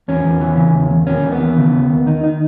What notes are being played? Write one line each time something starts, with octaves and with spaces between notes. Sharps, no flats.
E2 C#4
E2
E3
C#3
E2
E2
D#2 C#4
D#2
B3
E3
C#3
D#2
D#2
D#3 D#4
D#4